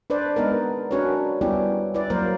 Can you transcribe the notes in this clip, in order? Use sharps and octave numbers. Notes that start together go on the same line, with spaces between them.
D4 B4 C5 D5
G#3 B3 D#4 A#4
C#4 D4 F#4 A#4 B4 C#5
G3 B3 C#4 E4 G4
E4 B4 D5
F#3 A#3 A#4 C5